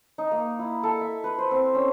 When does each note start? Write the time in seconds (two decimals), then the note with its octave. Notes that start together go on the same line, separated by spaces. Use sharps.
0.18 D#4
0.32 A#3
0.59 E4
0.83 A4
1.01 E5
1.24 B4
1.38 C5
1.51 C4
1.74 C#4